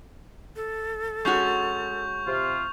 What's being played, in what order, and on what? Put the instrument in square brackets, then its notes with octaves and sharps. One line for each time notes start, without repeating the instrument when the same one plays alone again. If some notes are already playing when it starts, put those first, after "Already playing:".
[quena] A4
[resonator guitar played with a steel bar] G#3 C#4 F#4 [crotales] C#6 G6 F7
[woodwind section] C3 F4